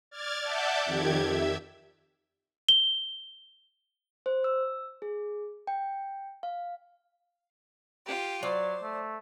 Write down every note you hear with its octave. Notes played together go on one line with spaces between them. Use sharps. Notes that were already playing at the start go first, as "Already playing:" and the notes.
D5 F6 G#6 A6
D5 E5 F#5 A5 D6 G6
F2 D#3 G4 G#6
E5
G7
C5
E6
G#4
G5
F5
F4 G4
F#3 C5 D5
A3